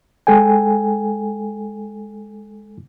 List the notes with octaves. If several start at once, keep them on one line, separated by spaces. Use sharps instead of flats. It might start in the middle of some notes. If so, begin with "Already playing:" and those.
G#3 A4 G5 G#5